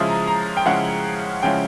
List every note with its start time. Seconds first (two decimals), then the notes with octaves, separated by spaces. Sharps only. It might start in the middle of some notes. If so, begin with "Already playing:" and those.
Already playing: C#3 F3 G#3 C#4 E4 D#6
0.09 A#5
0.27 A#5
0.57 G5
0.65 C#3 F3 G#3 C#4 E4 F#5
1.43 C#3 F3 G#3 C#4 E4 G5